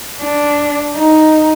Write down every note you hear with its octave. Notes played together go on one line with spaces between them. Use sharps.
D4
D#4